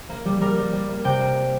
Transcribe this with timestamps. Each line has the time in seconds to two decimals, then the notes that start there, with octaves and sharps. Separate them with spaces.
0.09 A#3
0.25 G3
0.41 G3 A#4
0.57 G3
0.73 G3
0.89 A#3
1.04 C3 G5
1.20 A#3